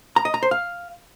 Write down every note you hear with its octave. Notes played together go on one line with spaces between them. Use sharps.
A#5
D#5
A#5
C5
F5